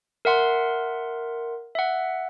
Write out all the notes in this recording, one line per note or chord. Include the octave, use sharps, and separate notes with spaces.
A#4 E5 F#5 C6
E5 F#5